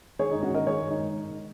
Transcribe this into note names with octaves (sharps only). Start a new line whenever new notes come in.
D#3 G#4 C#5
G#2 D#4 G#4
C#4 F#4
D#3 A#4 D#5
D#3 G#4 C#5
G#2
D#4
G#2
D#3
D#3